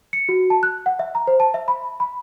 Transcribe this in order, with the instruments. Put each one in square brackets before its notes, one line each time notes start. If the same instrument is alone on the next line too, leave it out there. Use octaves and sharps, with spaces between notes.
[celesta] C#7
F#4
A5
F#6
F#5
E5
A#5
C5
A5
E5
B5
B5